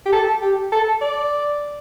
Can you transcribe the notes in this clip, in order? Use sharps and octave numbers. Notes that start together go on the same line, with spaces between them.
G4
A4
G4
A4
D5